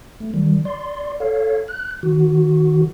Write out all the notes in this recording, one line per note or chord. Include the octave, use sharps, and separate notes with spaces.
A3
D#3 G3
D5 C6
A4 C#5 F5
F#6
D#3 F#4